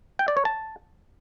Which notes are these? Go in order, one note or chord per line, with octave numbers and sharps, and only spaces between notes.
G5
D5
C#5
A5